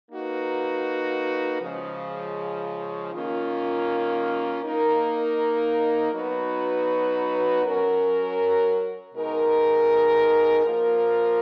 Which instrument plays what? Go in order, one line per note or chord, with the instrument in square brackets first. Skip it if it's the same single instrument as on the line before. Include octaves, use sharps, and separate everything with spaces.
[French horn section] A#3 D#4 F#4 B4
C#3 F3 G#3
D#3 A#3 C#4 F4
A#3 D#4 A#4
F#3 B3 D#4 F#4 B4
F#3 C#4 F#4 A#4
B2 G#3 D#4 A#4
F3 A#3 F4 A#4